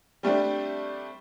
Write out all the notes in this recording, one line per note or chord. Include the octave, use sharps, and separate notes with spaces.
G3 A3 C4 D4